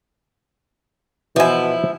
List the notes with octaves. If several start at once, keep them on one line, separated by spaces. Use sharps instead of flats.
B2 E3 F3 E4 G#5